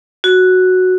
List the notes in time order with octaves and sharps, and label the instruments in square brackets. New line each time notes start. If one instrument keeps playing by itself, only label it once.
[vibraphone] F#4